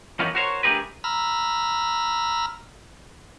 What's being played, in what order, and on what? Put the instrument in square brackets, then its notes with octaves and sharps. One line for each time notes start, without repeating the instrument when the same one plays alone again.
[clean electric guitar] E3 F3 A#3 B3 C#4 D#4
F#4 A#4 C5 C#5
A3 D4 G4 G#4 A#4 B4
[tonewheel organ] A#5 B5 E6 F6